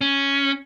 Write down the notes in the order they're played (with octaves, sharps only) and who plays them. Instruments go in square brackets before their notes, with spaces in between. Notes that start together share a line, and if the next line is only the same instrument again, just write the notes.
[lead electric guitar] C#4